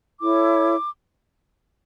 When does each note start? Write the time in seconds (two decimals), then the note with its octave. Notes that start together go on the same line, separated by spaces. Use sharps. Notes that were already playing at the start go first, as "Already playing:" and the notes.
0.21 E4 A4 C#5 D6